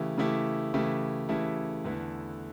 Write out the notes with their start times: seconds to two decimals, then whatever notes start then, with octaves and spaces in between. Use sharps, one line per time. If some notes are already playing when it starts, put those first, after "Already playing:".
Already playing: C#3 E3 A3 E4 G4
0.17 C#3 E3 A3 E4 G4
0.74 C#3 E3 A3 E4 G4
1.29 C#3 E3 A3 E4 G4
1.84 E2 D3 A3 E4 B4